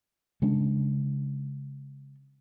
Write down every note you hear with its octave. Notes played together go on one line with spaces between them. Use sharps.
C#3 G#3 C#4 D4